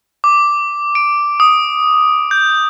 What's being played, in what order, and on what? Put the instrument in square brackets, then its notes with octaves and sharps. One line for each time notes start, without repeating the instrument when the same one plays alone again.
[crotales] D6
D7
D#6
G6